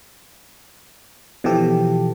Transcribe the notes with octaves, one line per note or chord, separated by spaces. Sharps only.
B2 E3 F3 G4 A4